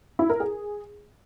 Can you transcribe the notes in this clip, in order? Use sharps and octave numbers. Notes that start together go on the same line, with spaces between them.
E4
A#4
G#4